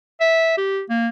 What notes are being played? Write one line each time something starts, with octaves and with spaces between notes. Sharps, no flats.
E5
G4
A#3